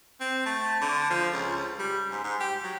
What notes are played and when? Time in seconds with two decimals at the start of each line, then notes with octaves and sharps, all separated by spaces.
0.20 C4
0.46 A3
0.81 D3
1.10 F3
1.33 C#2
1.79 G3
2.11 G#2
2.24 G#2
2.40 G4
2.63 F#3